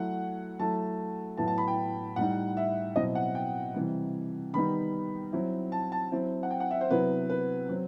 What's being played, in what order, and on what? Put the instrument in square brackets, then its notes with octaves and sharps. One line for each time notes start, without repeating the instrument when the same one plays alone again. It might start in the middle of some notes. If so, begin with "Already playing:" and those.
Already playing: [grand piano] F#3 A3 E4 F#5
F#3 A3 E4 A5
A2 F#3 B3 E4 A5
A5
B5
G5
A2 G3 D#4 F#5
E5
B2 F#3 C4 E4 D#5
F#5
G5
C3 E3 G3
D#3 G3 B3 D#4 B5
F#3 C4 E4
A5
A5
F#3 C4 E4
F#5
G5
F#5
E5
C5
C3 F#3 B3 E4 B4
B4
F#3 C4